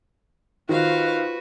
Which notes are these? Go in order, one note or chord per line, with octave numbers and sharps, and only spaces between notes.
D#3 F4 F#4 B4 C5 F5